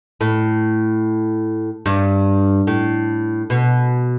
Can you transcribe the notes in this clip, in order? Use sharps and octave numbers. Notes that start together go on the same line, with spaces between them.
A2
G2
A2
B2